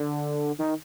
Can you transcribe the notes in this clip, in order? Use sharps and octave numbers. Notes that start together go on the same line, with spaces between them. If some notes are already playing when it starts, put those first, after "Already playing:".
Already playing: D3
D#3